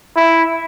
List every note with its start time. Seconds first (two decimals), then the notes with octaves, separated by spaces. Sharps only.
0.16 E4